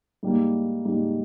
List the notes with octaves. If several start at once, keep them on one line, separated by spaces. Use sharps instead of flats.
G#2 G3 A#3
G#2 G3 A#3